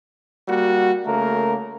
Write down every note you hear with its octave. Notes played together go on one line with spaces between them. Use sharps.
G3 A#3 F#4
C#3 A3 A#3 A#4